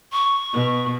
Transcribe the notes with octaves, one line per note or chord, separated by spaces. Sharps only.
C#6
B2